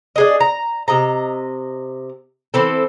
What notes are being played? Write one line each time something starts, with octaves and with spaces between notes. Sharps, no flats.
D4 G#4 D#5
A#5
C3 D#5 A#5
E3 C4 A4